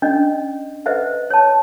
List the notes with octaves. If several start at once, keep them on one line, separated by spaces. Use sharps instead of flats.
C#4 D4 D5 D#5
B4 C5 D#5 E5 F#5
C#5 A5